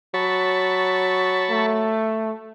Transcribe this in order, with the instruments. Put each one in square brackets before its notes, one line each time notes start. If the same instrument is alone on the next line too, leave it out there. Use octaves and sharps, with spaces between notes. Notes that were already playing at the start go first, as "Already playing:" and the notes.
[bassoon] F#3 [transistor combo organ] A5 B5 C#6
[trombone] A3